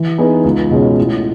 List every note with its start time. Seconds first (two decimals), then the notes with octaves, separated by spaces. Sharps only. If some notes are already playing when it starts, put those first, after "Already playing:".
Already playing: E3
0.18 B3 D#4 G#4 B4
0.44 C#2
0.71 B2 G#3 C#4
0.98 A2